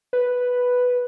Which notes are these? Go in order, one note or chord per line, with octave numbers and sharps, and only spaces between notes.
B4